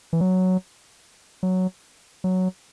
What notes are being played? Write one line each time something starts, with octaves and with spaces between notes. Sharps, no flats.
E3
F#3
F#3
F#3